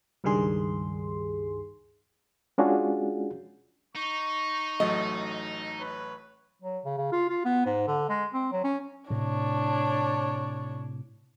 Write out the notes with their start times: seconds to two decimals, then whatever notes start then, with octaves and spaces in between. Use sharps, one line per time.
0.24 C#2 G2 D#3 G3 G#4 C6
2.58 G#3 C#4 D4 F4 F#4 G#4
3.96 D#4 C#6
4.80 A1 F#3 A3 D#5
5.78 B4 C#5
6.62 F#3
6.85 C#3
6.98 C#3
7.12 F4
7.30 F4
7.45 B3
7.66 G#2
7.87 D3
8.09 G#3
8.33 C4
8.52 F#3
8.64 C#4
9.10 A2 C3 D4 C#5